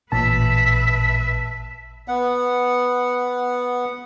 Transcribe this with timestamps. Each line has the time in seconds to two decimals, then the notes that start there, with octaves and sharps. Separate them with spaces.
0.12 A1 A#2 B4 E5 A5
2.08 B3 F#5